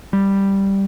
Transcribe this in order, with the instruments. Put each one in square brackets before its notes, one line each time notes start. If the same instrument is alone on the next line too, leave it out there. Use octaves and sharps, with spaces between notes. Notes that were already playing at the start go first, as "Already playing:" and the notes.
[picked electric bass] G3